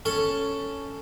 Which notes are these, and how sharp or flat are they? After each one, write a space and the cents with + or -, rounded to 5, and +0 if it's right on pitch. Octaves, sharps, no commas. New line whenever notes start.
C#4 +5 A4 +5